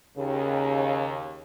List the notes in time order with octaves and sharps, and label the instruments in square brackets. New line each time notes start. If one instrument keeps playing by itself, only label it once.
[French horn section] D#2 [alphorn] C#3